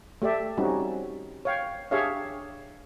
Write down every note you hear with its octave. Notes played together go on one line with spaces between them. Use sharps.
A3 G4 D5 E5
G3 C4 C#4 D#4 F#4
C#5 F5 G5
D4 G4 G#4 C#5 E5 F5